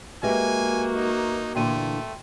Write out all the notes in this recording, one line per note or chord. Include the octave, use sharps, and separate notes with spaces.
G#3 A#3 F#4 G4 B4 E5 G#5
D#4
A#2 D3 E3 A3 G5 C6 D#7